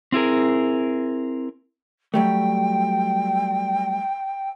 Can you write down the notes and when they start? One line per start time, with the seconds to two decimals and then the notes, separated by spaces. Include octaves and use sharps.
0.12 C4 E4 G#4 A#4
2.14 F#3 G3 A3 G5